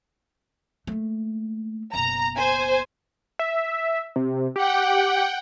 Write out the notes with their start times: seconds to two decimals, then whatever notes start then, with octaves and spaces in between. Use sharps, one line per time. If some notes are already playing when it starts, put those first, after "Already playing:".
0.87 A3 A#3
1.93 F#1 B2 A#5
2.36 C5 G#5
3.39 E5
4.16 C3
4.56 G4 F#5 G5